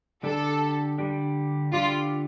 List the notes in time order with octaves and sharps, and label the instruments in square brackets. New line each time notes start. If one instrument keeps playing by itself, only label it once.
[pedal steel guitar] D3 G3 D4 G4 [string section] A4
[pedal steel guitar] D3 G3 D4 G4
[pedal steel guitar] D3 G3 D4 G4 [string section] F4